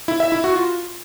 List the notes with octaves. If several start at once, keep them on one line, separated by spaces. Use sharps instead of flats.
E4
E5
E4
F#4
F4